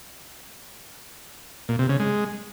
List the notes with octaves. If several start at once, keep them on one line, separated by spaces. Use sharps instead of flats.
A#2
C3
C#3
G#3